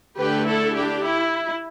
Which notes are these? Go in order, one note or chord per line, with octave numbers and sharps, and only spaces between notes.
D3 A3 D4 G4 B4
E4 A4
D4 G4
E4